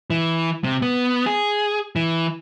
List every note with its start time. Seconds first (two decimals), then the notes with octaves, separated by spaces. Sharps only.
0.10 E3
0.64 C3
0.82 B3
1.26 G#4
1.96 E3